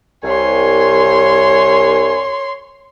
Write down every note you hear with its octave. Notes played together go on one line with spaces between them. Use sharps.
C2 C#5 G#5 C6